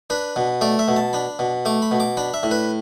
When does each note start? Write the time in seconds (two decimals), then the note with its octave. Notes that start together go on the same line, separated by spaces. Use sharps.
0.10 D4 B4
0.36 B2
0.61 A3 D5
0.79 E5
0.88 B2
0.96 A5
1.13 D4 B5
1.39 B2
1.65 A3 D6
1.82 B5
1.91 B2
2.00 D6
2.17 D4 B5
2.34 E5
2.43 A2
2.51 B4